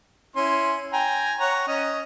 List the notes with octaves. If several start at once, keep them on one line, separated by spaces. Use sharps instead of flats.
C#4 E4 C6
G5 G#5 A#5
C#5 F#5 A#5
C#4 D#5